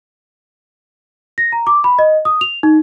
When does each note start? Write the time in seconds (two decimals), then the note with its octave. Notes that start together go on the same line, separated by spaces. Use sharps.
1.38 A#6
1.52 A#5
1.67 D6
1.84 B5
1.99 D#5
2.25 D#6
2.41 F7
2.63 D#4